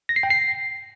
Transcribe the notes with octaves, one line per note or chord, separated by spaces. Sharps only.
A#6
C7
G5
C7